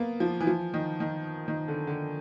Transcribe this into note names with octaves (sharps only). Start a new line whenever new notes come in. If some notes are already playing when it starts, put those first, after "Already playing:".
Already playing: A#3 B3
F3
E3
F3
D#3
D#3
D#3
D3
D3